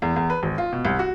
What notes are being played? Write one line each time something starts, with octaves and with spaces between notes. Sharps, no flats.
E2
E2
B4
G#1
F4
B2
C2
F#4